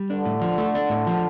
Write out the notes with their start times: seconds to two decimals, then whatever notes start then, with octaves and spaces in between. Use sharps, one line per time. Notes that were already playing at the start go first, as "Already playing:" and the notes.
Already playing: G3
0.10 D3 D4
0.26 A2
0.42 F3
0.58 A3
0.75 D4
0.90 A2
1.07 F3